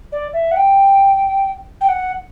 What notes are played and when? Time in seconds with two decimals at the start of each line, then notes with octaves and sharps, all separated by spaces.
0.12 D5
0.33 E5
0.51 F#5
0.57 G5
1.81 G5
1.88 F#5